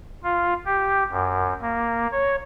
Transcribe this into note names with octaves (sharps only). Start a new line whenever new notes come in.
F4
G4
F#2
A#3
C#5